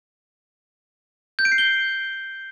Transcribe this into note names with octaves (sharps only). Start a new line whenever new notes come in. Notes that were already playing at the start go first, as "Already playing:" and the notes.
G6
D7
C7
G7